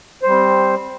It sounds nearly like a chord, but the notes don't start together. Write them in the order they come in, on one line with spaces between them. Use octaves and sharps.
C5 G3 C4